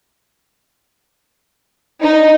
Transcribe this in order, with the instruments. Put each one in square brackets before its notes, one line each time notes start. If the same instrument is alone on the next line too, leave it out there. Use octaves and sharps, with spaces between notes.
[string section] D#4